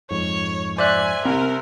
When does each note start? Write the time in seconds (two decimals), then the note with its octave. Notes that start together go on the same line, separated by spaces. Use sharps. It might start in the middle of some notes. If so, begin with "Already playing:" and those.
0.10 F2 G#2 C#5
0.78 C5 D5 E5 G#5 F#6
1.25 C2 C4 A#4